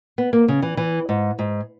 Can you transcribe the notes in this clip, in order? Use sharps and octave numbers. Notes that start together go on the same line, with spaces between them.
B3
A#3
C#3
E3
E3
G#2
G#2